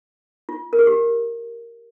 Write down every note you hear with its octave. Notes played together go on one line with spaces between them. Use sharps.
F4
A#4
G#4
G4